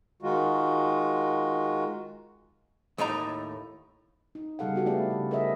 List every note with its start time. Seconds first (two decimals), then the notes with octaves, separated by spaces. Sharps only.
0.22 D#3 G#3 F4 F#4
2.98 D#2 A2 A3 D#4 A#4 A#5
4.35 D#4
4.59 C#3 G3 G#4 A4 F5 F#5
4.74 B3 F#4 G4 A4
4.86 A3 B3 E4 G#4 D5 F5
5.10 C#3 G#4
5.31 G#4 A#4 C5 D#5 E5